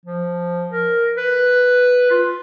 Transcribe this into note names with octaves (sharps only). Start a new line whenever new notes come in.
F3
A#4
B4
F4